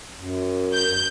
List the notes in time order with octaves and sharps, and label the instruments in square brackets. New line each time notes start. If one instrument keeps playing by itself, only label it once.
[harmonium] F#2
[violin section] G6